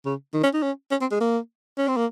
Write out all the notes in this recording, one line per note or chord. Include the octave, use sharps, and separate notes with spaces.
C#3
D#3
C#4
D#4
C#4
C#4
C4
G#3
A#3
C#4
C4
A#3